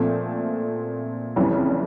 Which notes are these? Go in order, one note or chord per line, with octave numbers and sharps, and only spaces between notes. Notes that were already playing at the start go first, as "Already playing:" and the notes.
Already playing: A#2 F3 A3 C4
F#1 F2 C#3 E3 G3